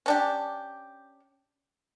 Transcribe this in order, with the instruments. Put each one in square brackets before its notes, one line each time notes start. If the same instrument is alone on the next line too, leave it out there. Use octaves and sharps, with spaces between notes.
[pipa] C#4 D4 G4